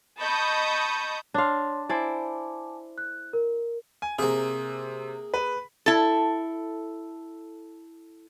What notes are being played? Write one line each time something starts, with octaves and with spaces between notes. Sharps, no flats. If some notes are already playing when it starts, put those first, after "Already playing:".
D#5 A5 B5 C#6 D#6 G6
D4 C#5 F5 C6
E4 C5 D5 G#5 A5 D6
F#6
A#4
G#5
C3 A#3 G#4
B4
E4 A4